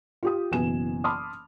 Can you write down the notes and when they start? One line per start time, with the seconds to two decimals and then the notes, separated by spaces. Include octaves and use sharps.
0.23 F4 G4 D#6
0.51 F#1 B2 E3 G#5 E7
1.04 A5 B5 C6 D6 D#6 F6